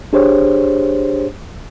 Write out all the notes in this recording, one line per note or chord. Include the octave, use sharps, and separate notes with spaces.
D4 G4 G#4 C5 C#5